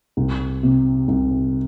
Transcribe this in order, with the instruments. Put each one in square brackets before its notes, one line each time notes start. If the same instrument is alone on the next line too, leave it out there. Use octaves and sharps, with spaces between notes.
[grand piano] C2
C3
C2